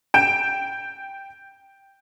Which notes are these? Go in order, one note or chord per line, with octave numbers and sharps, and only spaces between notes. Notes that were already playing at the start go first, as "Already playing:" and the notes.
G5 G6 D7 E7